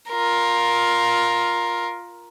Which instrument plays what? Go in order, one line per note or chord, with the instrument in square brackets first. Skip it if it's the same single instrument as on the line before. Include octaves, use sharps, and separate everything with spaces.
[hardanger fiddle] F4 A#4